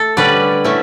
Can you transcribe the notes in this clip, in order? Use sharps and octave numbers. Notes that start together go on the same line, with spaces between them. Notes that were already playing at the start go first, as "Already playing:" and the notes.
Already playing: A3 A4
D3 G3 C#4 B4 D5
D3 A3 C#4 E4